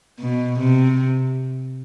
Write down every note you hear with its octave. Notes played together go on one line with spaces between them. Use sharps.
B2
C3